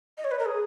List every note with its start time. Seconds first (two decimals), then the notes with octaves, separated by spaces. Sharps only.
0.18 D#5
0.24 C#5
0.31 B4
0.39 A#4
0.45 G#4